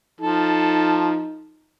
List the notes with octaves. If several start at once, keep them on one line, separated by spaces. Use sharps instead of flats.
F3 D#4 A4